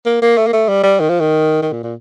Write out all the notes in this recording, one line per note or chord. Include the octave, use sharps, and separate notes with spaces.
A#3
A#3
A3
A#3
A3
G3
G3
D#3
F3
D#3
D#3
A#2
A#2